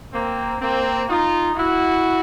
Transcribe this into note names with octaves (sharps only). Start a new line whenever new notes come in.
A#3 C4
A#3 C4
D#4 F4
E4 F#4